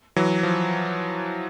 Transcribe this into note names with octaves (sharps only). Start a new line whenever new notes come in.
E3 F#3
F3